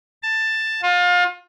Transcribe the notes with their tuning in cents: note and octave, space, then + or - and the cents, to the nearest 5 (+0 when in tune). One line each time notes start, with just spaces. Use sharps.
A5 +10
F4 +30